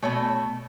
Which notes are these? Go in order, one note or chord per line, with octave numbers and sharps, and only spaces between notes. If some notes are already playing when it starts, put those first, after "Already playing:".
B2 A3 C#5